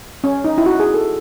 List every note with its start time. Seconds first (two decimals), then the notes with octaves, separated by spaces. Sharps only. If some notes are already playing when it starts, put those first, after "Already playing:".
0.24 C#4
0.45 D#4
0.58 E4
0.66 F#4
0.80 G#4
0.94 A4